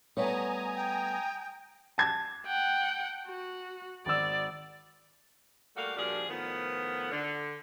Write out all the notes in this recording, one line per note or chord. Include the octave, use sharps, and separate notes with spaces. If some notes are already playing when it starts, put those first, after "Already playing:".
G3 A3 B3 C#5 G#5 A#5 D#6
G5
A5 G#6
F#5 G5
F#4
G#1 D5 E6
G3 A3 A#3 F#4 D5 F5
A#2 F3 G3 D4 F#4 G#4
A2 D#3 F3 B3
D3